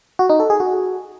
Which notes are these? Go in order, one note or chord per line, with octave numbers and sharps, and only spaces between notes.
F#4
D#4
A4
G#4
F#4